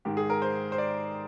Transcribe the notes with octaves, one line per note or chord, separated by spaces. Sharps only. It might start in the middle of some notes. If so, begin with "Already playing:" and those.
G#2 D#3 G4
G#4
A#4
C5
C5
D5